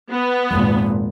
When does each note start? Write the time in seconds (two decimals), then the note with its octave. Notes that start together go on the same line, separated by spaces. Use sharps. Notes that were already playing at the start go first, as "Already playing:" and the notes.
0.10 B3
0.51 G#1 F2 A#2 G#3